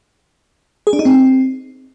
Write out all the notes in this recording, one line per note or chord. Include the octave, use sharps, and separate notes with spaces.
G#4
D4
D#4
C4